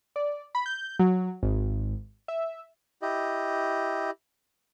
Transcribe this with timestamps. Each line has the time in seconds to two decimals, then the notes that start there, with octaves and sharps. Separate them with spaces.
0.16 D5
0.55 B5
0.66 G6
0.99 F#3
1.43 G#1
2.28 E5
3.02 E4 G4 D#5